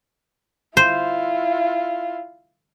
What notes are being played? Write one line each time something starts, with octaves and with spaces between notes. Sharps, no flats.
E4 F4 C5